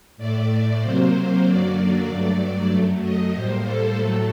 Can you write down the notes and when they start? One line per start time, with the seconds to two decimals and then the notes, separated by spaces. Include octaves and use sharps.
0.17 A2 A3 D5
0.80 C3 F#3 A#3 C5
1.45 F#2 D3 F#3 A#3 D5
2.08 G2 F#3 A3 D5
2.71 F#2 F#3 A3
3.02 D#5
3.34 A2 G3 A#3 C5
3.65 A4
3.98 A2 F#3 A3